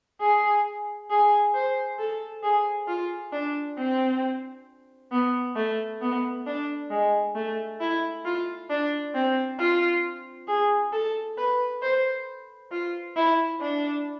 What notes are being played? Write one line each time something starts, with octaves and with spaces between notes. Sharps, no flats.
G#4
G#4
C5
A4
G#4
F4
D4
C4
B3
A3
B3
D4
G#3
A3
E4
F4
D4
C4
F4
G#4
A4
B4
C5
F4
E4
D4